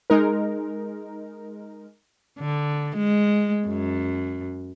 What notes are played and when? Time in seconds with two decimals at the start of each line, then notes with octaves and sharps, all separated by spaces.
0.10 G#3 D#4 A#4
2.40 D3
2.96 G#3
3.68 F#2